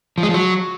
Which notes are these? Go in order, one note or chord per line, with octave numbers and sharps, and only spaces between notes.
F3
G#3
F3
F#3